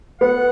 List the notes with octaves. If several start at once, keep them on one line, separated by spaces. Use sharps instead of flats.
B3 F#5